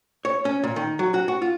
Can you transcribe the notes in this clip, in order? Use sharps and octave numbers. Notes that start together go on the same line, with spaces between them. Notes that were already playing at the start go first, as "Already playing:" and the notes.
C#5
C#4
A#2
D#3
F#3
F#4
F#4
F4